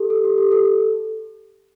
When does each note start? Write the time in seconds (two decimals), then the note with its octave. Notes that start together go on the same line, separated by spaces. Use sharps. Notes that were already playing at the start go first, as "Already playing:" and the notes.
Already playing: G4 A4
0.10 A4
0.24 G4
0.38 G4
0.52 A4